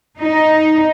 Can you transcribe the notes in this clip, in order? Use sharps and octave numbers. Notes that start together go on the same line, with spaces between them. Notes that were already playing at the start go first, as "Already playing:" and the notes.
D#4